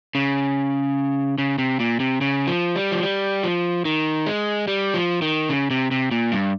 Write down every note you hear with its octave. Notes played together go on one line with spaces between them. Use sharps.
C#3
C#3
C3
A#2
C3
C#3
F3
G3
F3
G3
F3
D#3
G#3
G3
F3
D#3
C#3
C3
C3
A#2
G2